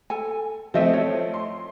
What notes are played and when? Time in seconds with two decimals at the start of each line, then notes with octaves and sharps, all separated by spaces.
0.10 A4 G#5
0.74 F3 A3 C4 C5 D#5 E5
0.93 C#5
1.34 C6